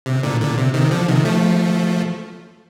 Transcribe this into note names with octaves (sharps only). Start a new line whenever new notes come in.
C3
A#2 D3
A#2 D3
C3
C3 D#3
D3 F3
C3 D#3
F3 A3